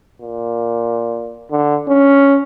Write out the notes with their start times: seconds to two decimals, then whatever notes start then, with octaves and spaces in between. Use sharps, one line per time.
0.21 A#2
1.51 D3
1.88 C#4